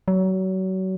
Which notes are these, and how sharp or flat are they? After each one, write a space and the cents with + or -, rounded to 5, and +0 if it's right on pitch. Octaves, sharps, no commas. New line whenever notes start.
F#3 +30